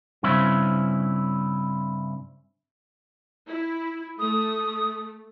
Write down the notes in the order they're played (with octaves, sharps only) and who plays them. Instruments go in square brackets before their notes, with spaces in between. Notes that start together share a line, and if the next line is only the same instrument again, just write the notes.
[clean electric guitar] G2 C#3 C4 C#4 E4
[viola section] E4
[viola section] A3 [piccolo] D#6